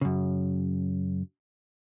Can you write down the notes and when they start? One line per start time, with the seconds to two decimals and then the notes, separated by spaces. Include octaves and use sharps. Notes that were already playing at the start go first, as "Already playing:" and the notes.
0.01 F#2 C#3